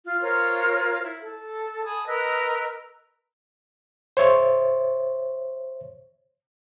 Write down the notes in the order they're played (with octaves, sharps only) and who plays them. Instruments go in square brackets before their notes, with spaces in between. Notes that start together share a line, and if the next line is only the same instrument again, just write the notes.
[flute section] F4
F4 A#4 C5 C#5
E4
A4
G#5 A5 B5 D#6
A#4 B4 D#5 E6
[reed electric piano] C5 C#5 E5